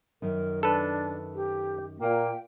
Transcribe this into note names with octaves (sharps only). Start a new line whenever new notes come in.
F#2 D#3 A#4
D4 A4 B4
G4
A#2 A#3 G5